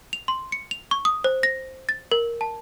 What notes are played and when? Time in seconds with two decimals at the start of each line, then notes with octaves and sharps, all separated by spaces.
0.13 F7
0.28 C6
0.52 C#7
0.71 F7
0.91 C#6
1.05 D#6
1.24 C5
1.43 A#6
1.89 A6
2.12 A#4
2.41 A5